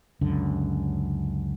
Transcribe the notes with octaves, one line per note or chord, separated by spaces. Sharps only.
C#2 F#2 D3